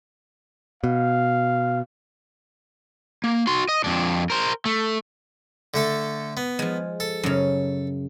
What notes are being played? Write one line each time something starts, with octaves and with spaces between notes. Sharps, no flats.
B2 F5
A#3
F#4 C6
D#5
F2 D4
A#4 C5
A3
D3 A3 A4
B3
F3 G#3
A4
F#2 C#3